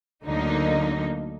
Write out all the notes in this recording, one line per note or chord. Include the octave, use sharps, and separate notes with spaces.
D2 D3 F#3 A#3 D#4